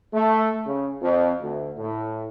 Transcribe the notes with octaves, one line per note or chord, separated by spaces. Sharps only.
A3
C#3
F2
D2
A2